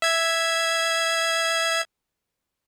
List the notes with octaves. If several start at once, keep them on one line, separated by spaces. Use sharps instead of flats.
E5 G#6